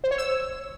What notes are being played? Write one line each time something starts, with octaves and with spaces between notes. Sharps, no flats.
C5
C#5
E6